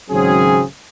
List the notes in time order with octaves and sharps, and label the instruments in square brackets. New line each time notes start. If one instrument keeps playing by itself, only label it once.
[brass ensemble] G#1 C#3 F#3 C4 C#4 G#4